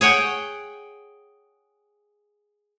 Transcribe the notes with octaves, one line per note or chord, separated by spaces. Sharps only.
G#4 C#5 F#5 G5